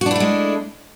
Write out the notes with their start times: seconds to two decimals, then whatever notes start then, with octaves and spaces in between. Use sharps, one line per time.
0.01 F#4
0.06 D4
0.11 E4
0.16 A3
0.20 G#3